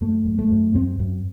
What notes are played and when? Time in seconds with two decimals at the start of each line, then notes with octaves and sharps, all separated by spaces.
0.01 F#2 A3
0.26 F#2
0.39 A3
0.51 F#2
0.74 F#2 C4
0.99 F#2